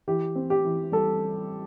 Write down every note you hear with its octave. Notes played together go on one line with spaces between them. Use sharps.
E3 G4
C4
G4
E3
G3 A4